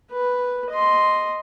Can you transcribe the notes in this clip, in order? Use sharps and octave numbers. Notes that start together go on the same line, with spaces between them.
B4
D#5 C6